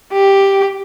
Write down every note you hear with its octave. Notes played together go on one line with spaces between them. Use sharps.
G4